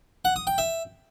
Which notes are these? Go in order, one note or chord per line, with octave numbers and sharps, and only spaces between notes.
F#5
D#6
G5
E5